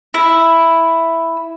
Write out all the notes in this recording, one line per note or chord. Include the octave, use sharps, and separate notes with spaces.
E4